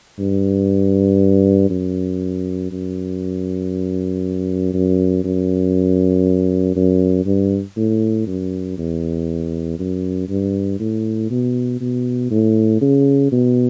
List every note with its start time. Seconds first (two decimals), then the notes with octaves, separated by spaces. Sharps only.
0.19 G2
1.70 F#2
2.72 F#2
4.73 F#2
5.24 F#2
6.76 F#2
7.26 G2
7.77 A2
8.27 F#2
8.78 E2
9.79 F#2
10.29 G2
10.79 A2
11.30 B2
11.81 B2
12.31 A2
12.81 C#3
13.32 B2